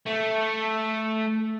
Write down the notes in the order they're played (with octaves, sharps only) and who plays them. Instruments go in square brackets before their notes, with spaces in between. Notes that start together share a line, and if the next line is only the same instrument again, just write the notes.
[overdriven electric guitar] A3